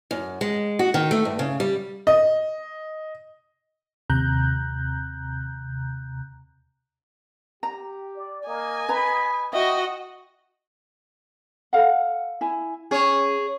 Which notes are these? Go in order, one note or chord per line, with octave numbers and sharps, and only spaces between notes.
F#2
G#3
F#4
D#3
A3
G2
C#3
G3
D#5
D#2 C3 A#5 F#6 G6
G4 A#5
D5
A#3 D#5 G#5
B4 A#5 B5
F#4 D#5 E5 G5
A4 F5 F#5
E4 G#5
C#4 G#4 C#5